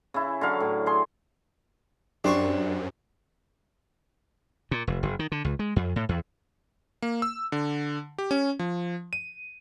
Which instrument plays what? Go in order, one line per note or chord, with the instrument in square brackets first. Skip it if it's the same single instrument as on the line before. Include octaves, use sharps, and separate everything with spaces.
[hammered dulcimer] C#3 E4
D3 F#3 F5
A2
G#4 C6
[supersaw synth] F#2 [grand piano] D4 [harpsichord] G4 C5 C#6
[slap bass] A#2
F1
F#1
D#3
D3
C#2
G#3
F2
A2
E2
[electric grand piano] A#3
E6
D3
G4
C#4
F3
D#7